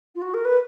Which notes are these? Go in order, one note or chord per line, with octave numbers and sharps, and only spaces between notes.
F4
F#4
A#4
B4